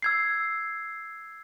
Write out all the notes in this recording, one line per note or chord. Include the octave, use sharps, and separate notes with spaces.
E6 G#6 C7